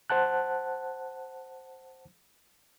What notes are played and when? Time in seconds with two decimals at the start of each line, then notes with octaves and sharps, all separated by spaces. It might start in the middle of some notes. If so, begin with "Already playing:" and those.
0.10 C5 F#5 A5 F#6